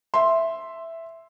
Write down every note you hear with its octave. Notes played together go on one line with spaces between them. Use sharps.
E5 C6